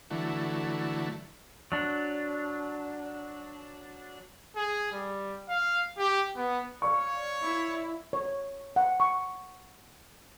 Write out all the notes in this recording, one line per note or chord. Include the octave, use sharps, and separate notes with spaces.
D3 E3 F#3 A3
F#3 D4
G#4
G3
F5
G4
B3
C#5 D5 F5 C#6
E4
C#5
F#5
C#6